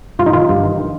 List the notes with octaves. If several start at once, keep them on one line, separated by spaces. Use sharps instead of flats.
G2 F4
D#4
D#3 F4
G2
D#3
D#3